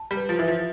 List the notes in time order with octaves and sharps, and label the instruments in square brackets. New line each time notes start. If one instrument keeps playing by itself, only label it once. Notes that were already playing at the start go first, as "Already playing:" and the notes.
Already playing: [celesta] A5
[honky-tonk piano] G3
[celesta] B4
[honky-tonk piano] F3
[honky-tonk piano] E3 [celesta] E5
[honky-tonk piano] F3